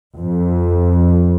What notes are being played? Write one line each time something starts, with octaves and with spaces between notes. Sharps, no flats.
F2